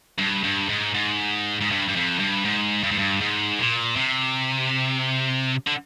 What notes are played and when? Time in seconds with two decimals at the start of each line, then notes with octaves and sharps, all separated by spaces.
0.19 G2
0.44 G2
0.69 G#2
0.95 G#2
1.61 G#2
1.70 G2
1.88 G2
1.96 F2
2.20 G2
2.45 G#2
2.83 G2
2.92 G#2
2.99 G2
3.20 G#2
3.59 A#2
3.96 C3
5.67 D3